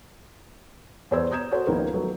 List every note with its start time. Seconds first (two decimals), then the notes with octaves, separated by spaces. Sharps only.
1.11 E2 B3 C5 D5 E6 G#6
1.31 A#5 D#6 G6 G#6 E7
1.51 F#4 A4 C5
1.67 C#2 D#3 F3 A#3 B3
1.93 F#3 A3 B3